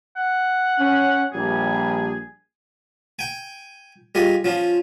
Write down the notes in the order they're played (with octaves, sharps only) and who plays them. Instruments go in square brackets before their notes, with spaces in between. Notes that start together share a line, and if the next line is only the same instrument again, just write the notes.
[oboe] F#5
[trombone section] C#4
[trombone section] A#1 G3 [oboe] G#4
[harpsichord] G5 G#5
G3 F4 G#4 D#5
F3 C#4 F4